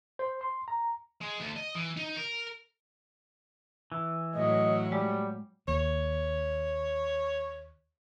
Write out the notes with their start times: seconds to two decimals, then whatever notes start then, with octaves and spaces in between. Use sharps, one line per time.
0.19 C5
0.41 C6
0.68 A#5
1.21 G#3
1.40 D2
1.56 D#5
1.75 E3
1.97 D#4
2.17 A#4
3.92 E3
4.35 A2 F#3 D#5
4.92 G3 G#3
5.68 D#2 C#5